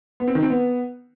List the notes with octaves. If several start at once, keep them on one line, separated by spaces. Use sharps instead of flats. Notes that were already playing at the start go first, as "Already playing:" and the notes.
B3
C4
D#3
C4
B3